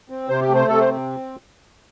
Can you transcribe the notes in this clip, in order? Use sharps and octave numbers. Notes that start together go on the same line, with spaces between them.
C4
C3 C5
G4
A3
C5
C3 A4
C5
C4